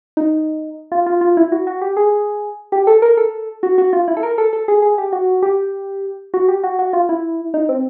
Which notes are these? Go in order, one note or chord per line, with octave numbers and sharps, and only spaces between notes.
D#4
F4
F4
F4
E4
F#4
F#4
G4
G#4
G4
A4
A#4
A4
F#4
F#4
F4
E4
A4
A#4
A4
A4
G#4
G#4
G4
F#4
G4
F#4
G4
F#4
F#4
F4
E4
D#4
C4